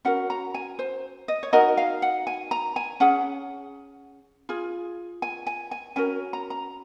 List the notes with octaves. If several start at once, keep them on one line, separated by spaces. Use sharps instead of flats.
C#4 F#4 A#4 F#5
A#5
G#5
C5
D#5
C#5
D#4 F#4 A#4 D#5
F5
F#5
G#5
A#5
G#5
C#4 G#4 F#5
F4 G#4
G#5
G#5
G#5
C#4 F#4 A#4 G#5
A#5
A#5